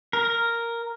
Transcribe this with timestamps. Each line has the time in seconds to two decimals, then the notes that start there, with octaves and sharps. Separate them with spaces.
0.13 A#4